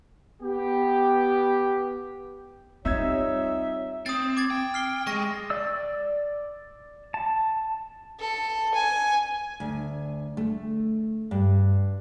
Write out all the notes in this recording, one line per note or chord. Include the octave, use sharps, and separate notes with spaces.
B3 G4
G3 C4 D#4 F4 C#5 E5 E6 G#6
C4 D#6 A6
D6 G#6 A6
G5
F6 C7 G7
G#3 C#6 A#6
D5 E6
A5
A4
G#5
D2
A3
G2